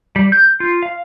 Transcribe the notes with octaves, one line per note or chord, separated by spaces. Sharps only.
G3
G6
F4
F5